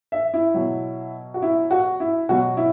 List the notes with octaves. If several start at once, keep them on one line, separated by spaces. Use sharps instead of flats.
E5
E4
B2 F#3
F#4
E4
F#4
E4
B2 F#3 F#4
E4